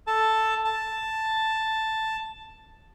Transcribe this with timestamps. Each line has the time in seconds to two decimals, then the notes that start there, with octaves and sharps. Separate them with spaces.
0.07 A4 A5
0.65 A5